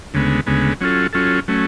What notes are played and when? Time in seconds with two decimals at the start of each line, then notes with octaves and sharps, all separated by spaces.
0.14 D2 C#3 G#3 B3
0.46 D2 C#3 G#3 B3
0.81 F#3 C#4 F4 A4
1.13 F#3 C#4 F4 A4
1.48 F#3 A3 C#4